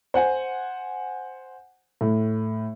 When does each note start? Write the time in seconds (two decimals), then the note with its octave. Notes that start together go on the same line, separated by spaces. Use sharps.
0.14 C5 F#5 G#5
2.01 A2